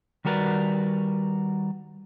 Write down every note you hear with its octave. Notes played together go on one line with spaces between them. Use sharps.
D#3 G3 F#4 A#4 B4 D5